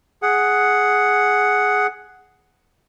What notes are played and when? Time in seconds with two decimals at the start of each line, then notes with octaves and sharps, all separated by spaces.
0.22 G#4 F#5